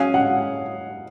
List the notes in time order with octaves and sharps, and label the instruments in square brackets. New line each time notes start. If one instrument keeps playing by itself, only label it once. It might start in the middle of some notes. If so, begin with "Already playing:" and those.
Already playing: [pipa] F#3 C#4 G#4 [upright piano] F5
[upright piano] F#5